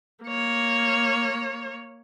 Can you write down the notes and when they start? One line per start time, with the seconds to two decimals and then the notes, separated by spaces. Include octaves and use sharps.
0.24 A#3 C#5